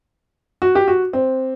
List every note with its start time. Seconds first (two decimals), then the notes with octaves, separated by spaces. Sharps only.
0.62 F#4
0.75 G4
0.88 F#4
1.13 C4